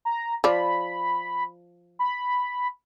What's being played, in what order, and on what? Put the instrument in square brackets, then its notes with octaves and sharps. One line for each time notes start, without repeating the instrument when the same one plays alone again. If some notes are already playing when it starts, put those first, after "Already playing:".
[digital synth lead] A#5
[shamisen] F3 D5 [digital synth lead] B5
[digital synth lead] B5